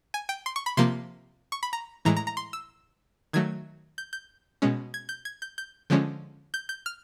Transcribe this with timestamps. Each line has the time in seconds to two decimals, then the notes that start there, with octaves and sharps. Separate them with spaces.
0.14 G#5
0.29 G5
0.46 C6
0.56 C#6
0.66 B5
0.77 C3 F3 A#3 C6
1.52 C#6
1.63 B5
1.73 A#5
2.05 A2 E3 G#3 A#5
2.16 A#5
2.27 A#5
2.37 C6
2.53 E6
3.33 D#3 F#3 A3 G#6
3.98 G6
4.13 G6
4.62 B2 G#3 C#4
4.94 G#6
5.09 G6
5.25 G#6
5.42 G6
5.58 G6
5.90 D3 F3 G#3 C#4
6.54 G6
6.69 G6
6.86 F6